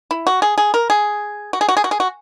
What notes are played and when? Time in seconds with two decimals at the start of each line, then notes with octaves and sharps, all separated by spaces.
0.11 E4
0.27 F#4
0.42 G#4
0.58 G#4
0.74 A#4
0.90 G#4
1.53 F#4
1.61 G#4
1.69 F#4
1.77 G#4
1.84 F#4
1.91 G#4
2.00 F#4